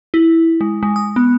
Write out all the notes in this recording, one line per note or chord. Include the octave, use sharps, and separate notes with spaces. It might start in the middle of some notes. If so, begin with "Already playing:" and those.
E4
G#3
G#3
D#6
B3